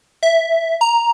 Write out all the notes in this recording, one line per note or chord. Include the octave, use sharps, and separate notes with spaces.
E5
A#5